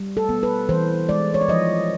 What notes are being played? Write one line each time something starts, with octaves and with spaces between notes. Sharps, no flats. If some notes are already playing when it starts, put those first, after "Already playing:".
Already playing: G3
A4
B3
B4
E3 C5
G#3 D5
C#5
D5
F3 D#5